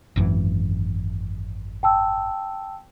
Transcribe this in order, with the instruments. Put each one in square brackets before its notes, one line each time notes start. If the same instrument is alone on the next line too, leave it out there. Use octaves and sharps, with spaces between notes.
[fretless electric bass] G#1 F#2 E3
[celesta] G5 A5 E6